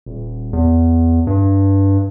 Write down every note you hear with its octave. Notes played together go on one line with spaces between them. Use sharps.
D#1
E2
G2